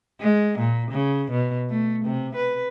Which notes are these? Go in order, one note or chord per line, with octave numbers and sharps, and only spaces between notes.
G#3
A#2
C#3
B2
A3
C3
B4